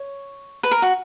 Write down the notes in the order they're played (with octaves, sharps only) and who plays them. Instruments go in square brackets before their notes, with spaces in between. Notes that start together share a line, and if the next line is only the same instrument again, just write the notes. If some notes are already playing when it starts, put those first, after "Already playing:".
Already playing: [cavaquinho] C#5
B4
A#4
F#4